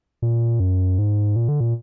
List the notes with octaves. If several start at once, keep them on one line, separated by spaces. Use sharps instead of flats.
A#2
F#2
G#2
A#2
D3
A#2